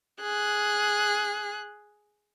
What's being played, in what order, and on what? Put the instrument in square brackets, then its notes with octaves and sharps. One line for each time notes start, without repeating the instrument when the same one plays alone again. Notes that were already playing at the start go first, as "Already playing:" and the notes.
[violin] G#4 F#6